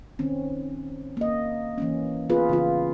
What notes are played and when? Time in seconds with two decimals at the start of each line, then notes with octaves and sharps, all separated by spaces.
0.19 D#3 C4 C#4
1.17 A#3 D#5
1.78 E3 A#3 C#4
2.30 B3 F4 G#4 B4
2.49 C#3 E3 F4